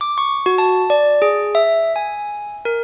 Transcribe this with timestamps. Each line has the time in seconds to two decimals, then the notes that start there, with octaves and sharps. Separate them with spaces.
0.01 D6
0.18 C#6
0.46 F#4
0.58 A5
0.90 D5
1.22 G#4
1.55 E5
1.96 G#5
2.65 A#4